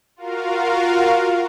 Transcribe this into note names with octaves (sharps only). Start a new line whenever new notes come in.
F4 F#4 A#4 F5